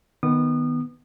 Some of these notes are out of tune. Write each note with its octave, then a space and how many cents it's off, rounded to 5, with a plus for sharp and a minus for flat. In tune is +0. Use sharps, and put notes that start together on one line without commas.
D#3 +0 B3 +0 D#6 -30